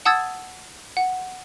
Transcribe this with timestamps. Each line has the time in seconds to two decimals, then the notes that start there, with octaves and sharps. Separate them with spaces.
0.05 F#5 A5 D#6 E6 G#6 A6
0.97 F#5